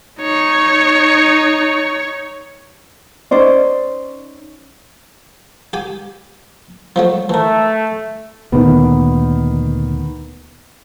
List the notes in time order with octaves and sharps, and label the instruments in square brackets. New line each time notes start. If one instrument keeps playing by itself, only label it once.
[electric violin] D#4 C#5
[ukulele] C#4 D#4 C5 D5
[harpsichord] G4 G#5
F3 F#3 A3
[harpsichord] E3 A#4 [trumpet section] A3
[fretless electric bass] D2 A#2 D3 [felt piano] D#3 B3